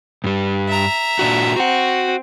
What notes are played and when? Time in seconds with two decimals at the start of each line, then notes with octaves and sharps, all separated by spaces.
0.24 G2 G3
0.68 E5 A#5
1.19 A#2 D4 F#4
1.56 C4 F#4 F#5